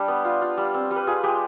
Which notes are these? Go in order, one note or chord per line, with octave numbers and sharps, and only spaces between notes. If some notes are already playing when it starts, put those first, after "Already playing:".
Already playing: G3 D4 G4
B3
F4
F4
G3
C4
G3
B4
F4 G#4
G#3 G4